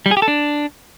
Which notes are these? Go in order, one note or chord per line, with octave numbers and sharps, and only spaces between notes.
G3
G#4
G4
A4
D4